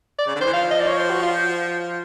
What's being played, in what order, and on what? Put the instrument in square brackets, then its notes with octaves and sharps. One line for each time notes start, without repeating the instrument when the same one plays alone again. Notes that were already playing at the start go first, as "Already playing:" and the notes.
[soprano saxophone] D5
[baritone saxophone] C#3
D3
[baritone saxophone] D#3 [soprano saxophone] C5
[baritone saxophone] E3
[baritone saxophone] F3 [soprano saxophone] F5
[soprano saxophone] D#5
D5
C#5
C5
F#4
F4